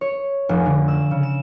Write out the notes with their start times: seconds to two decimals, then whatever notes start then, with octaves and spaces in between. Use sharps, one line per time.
0.01 C#5
0.49 F1
0.66 D3
0.88 E6
1.11 C#3
1.23 E7